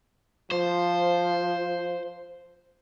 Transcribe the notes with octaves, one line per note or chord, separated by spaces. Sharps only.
F3 C5